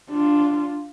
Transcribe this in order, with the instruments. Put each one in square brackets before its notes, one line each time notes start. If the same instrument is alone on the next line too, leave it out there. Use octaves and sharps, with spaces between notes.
[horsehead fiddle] D4 F4